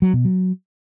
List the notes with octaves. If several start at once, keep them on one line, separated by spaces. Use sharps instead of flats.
F#3
B2
F#3